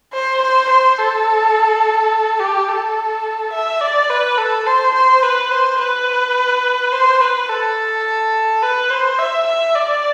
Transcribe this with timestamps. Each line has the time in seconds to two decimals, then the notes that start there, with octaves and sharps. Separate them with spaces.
0.13 C5
0.42 C5
0.70 C5
0.99 A4
2.40 G4
2.68 A4
3.53 E5
3.81 D5
4.10 B4
4.38 A4
4.67 C5
4.94 C5
5.23 B4
5.51 C5
5.79 B4
6.92 C5
7.21 B4
7.49 A4
8.63 B4
8.90 C5
9.19 E5
9.47 E5
9.76 D5